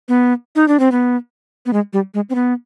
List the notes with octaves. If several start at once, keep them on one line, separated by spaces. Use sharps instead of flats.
B3
D#4
D4
C4
B3
B3
G#3
G3
G#3
C4
B3